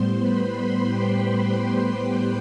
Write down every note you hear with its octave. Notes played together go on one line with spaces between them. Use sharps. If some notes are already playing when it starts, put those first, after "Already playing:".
Already playing: A2 G3 B3 C5 C6
B4 B5
G4 G5